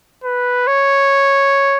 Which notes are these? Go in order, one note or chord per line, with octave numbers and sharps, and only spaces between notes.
B4
C#5